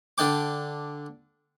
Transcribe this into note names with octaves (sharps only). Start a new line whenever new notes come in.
D3 D4 G5 D6